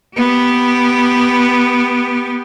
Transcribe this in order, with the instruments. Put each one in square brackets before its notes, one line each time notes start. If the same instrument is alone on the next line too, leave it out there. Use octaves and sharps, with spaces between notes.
[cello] B3 G4